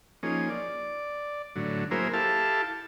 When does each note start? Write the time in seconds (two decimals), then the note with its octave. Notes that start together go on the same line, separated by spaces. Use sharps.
0.23 F3 A#3 C#4 D#4 G#4
0.49 D5
1.56 A2 D3 F#3
1.91 F#3 A#3 E4 G#4 A#4 C5
2.13 E4 G4 A4 F5 A5